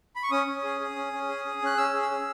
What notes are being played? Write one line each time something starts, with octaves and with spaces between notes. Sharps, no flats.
B5
C#6
C#4 D#6
C#4
G#4
G#4
C#4
C#4
G#4
G#4
C#4 F#6
C#4 E6
G#4
E6
G#4